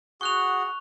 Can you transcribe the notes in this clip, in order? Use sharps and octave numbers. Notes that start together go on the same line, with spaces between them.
F#4 G#4 F#5 C#6 F#6 F7